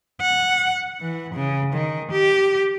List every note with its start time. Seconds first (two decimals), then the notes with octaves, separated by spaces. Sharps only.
0.21 F#5
1.01 E3
1.34 C#3
1.73 D#3
2.11 G4